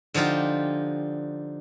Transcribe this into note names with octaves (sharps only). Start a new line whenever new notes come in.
D3 F3 D#4 F4 G4